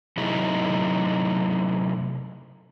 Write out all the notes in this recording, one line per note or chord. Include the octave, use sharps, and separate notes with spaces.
C3 F#3 A3 D#4 E4 G#4